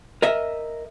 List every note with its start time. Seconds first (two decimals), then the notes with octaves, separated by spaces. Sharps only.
0.22 A#4 D#5 E5